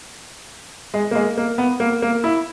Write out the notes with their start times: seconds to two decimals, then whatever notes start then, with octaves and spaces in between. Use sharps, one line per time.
0.94 G#3
1.11 A#3
1.15 G#3
1.37 A#3
1.58 B3
1.80 A#3
2.02 A#3
2.24 E4